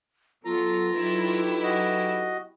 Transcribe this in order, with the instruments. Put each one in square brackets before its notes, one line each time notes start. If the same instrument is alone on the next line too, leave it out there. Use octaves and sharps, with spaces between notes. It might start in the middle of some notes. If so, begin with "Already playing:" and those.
[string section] F#3 [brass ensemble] B3 A4 [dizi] F4 [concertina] A#5
[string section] F#3 E4 G4 [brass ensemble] D#4 A4 B4
[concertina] F#4 D#5